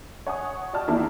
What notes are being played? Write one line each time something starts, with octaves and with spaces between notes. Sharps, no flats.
C#5 F#5 G#5 C#6 D#6
G4 D5 D#5 G5 A5 F6
E2 D#3 A#3 E4 D5 A5